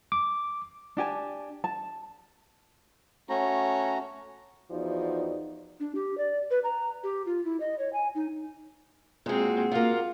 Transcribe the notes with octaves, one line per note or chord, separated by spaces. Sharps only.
D6
D4 G4 G#5 A5
A5
A3 C#4 F#4 A#5
E2 F3 D#4 F#4 D5
D4
G4
D5
B4
A#5
G4
F4
E4
D#5
C#5
G#5
D#4
A#2 G#3 C4 F#4
A#3 F4 F#4